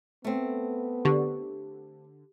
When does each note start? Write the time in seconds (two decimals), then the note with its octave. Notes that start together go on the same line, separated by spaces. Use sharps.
0.24 A3 B3 C4
1.05 D3 G4